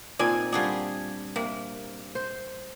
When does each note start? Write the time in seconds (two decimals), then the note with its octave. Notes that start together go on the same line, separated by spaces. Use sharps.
0.19 A#2 D#3 C4 D#4 D5 G#5
0.52 G3 D4 F4 F#4 G#4
1.36 C3 A#3
2.15 C5